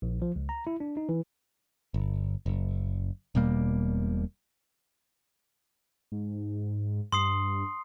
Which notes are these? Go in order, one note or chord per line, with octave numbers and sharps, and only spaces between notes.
A#1
F3
C#2
A#5
E4
D4
D#4
E3
G1
F#1
E1 B2 G3 A#3
G#2
G2 C6 D#6 C7